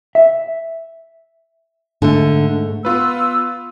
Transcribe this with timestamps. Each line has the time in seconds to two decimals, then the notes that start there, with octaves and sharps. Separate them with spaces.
0.15 E5
2.02 G#2 D3 A3
2.85 B3 F4 B4 E6